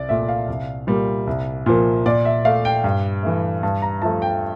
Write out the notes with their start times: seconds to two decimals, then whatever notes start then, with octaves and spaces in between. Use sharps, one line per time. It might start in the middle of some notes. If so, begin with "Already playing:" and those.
Already playing: C2 D5
0.09 A#2 A3 E5
0.29 F5
0.48 C2
0.87 A#2 G3 A#3
1.27 C2
1.66 A#2 F3 A#3
2.06 A#2 D5
2.25 E5
2.45 A3 F5
2.65 G5
2.84 G2
3.23 E3 A3
3.63 G2 A5
3.82 A#5
4.02 F3 A3 A5
4.22 G5